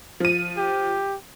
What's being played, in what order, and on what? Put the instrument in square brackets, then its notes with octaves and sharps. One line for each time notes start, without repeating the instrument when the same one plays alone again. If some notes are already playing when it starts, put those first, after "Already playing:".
[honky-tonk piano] F3 D#7
[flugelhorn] G4